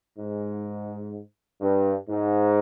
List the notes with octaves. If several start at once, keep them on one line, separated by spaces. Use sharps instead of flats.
G#2
G2
G#2